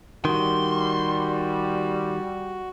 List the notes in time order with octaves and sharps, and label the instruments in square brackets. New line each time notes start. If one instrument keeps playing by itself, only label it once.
[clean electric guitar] D#3 [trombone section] G3 [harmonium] F#4 [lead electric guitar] C6